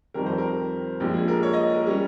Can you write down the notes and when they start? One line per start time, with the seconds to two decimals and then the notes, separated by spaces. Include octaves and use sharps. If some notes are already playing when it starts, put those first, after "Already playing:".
0.14 F2 D#3 G3 A#4
0.26 C5
0.38 A#4
1.00 A#1 A#2 G#3 G4
1.14 G#4
1.28 A#4
1.43 C#5
1.53 D#5
1.74 A#4
1.86 G3 C#4